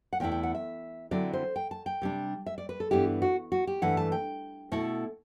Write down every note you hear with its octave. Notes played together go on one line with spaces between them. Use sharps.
F#5
E2 B2 A3 E4 G5
G5
F#5
E5
D3 F#3 C4 E4 D5
C5
G5
A5
G5
C3 G3 D4
E5
D5
B4
A4
G2 E3 B3 E4 G4
F#4
F#4
G4
G2 E3 A3 F#5
A5
G5
B2 A3 E4